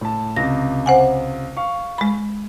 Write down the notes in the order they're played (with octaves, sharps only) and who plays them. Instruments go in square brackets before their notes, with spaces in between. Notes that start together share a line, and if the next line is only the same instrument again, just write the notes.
[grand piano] A2 A5
[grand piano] C#2 C3 [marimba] A#6
[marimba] C5 F#5 G#5
[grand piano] F5 C#6
[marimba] G#3 B5